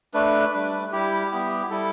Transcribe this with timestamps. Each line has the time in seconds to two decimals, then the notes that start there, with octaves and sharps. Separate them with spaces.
0.14 A3 D4 B4
0.54 G3 D4
0.92 G3 E4 G4
1.31 G3 B3 E4 G4
1.70 G3 E4 A4